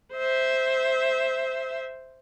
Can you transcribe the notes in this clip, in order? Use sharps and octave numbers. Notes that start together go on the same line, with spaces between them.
C5 E5